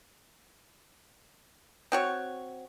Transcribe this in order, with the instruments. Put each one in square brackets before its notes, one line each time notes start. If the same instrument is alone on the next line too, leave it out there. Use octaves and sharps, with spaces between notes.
[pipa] C4 F#4 C#5